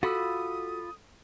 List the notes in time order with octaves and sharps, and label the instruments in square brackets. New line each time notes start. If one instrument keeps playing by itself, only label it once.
[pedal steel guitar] F4 B5 E6 [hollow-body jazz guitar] F#4 [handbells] A4 [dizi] D#6